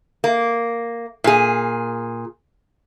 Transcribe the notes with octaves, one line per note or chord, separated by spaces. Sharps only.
A#3
A#2 G#4